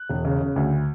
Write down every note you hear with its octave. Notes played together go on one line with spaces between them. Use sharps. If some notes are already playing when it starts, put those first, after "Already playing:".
Already playing: F#6
E1
C#3
C#3
D2